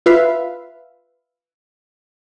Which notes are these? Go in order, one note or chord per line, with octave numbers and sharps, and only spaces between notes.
F4 B4 E5 F5